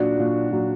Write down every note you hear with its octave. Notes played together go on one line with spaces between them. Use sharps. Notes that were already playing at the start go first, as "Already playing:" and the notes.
Already playing: A#2 F#3 D4 F#4
A#2 F#3
A#2 F#3